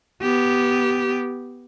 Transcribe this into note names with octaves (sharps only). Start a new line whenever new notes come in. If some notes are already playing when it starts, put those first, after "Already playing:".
B3 G4